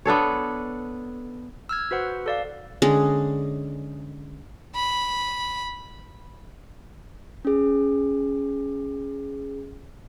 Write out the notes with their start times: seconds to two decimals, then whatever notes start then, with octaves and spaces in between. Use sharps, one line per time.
0.05 B3 D4 A4 C#5
1.69 E6 F6 G#6
1.91 F#4 B4 C5 F#5
2.26 A4 D5 F5
2.82 D3 G#3 C#4 G#4
4.75 B5
7.45 C#4 G#4